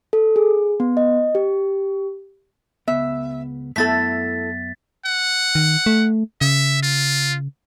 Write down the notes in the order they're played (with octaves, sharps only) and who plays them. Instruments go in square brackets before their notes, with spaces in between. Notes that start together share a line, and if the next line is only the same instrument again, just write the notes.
[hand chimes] A4
G#4
B3
D#5
G4
[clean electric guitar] C#2 B3 [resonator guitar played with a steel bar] E5
[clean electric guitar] F#2 B3 E5 [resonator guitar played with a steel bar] A3 E4 A4 [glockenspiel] A6 B6
[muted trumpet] F#5
[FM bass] D#3
A3
[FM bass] C#3 [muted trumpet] E5
[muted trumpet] F4